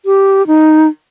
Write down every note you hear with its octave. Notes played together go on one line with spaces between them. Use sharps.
G4
D#4